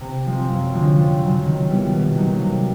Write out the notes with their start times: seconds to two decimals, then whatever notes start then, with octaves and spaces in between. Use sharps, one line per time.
0.01 C3
0.25 F3 G#3 C4 F4
0.49 F#2
0.73 D3 F3 G#3 C#4
0.97 F2
1.20 C#3 F#3
1.45 D#3
1.69 G3 B3 E4
1.92 B2
2.16 F#3 A#3 D#4 F#4
2.41 C3